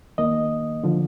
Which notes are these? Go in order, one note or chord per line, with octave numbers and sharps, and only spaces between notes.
D#2 D#3 A#3 D#5
D3 F3